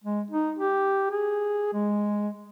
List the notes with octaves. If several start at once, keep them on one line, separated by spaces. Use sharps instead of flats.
G#3
D#4
G4
G#4
G#3